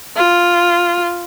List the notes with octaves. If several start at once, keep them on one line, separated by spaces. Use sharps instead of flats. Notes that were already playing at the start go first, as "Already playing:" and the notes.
F4